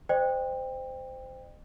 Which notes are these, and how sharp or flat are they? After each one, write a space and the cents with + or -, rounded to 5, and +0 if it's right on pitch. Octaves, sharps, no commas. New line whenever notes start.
C5 -15 D#5 -45 G5 +20